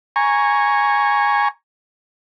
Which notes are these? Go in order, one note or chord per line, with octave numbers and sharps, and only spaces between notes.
G#5 A#5 C#6